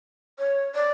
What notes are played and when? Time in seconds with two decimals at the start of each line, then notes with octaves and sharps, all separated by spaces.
0.39 C#5
0.75 D5